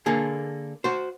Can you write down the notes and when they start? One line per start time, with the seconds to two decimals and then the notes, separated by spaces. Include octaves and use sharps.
0.06 D3 A#3 G#4 A4
0.84 F#4 C5